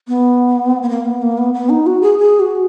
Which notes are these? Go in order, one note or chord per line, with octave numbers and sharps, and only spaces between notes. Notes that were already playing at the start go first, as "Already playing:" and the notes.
B3
B3
A#3
B3
A#3
B3
B3
D#4
F#4
G#4
G#4
F#4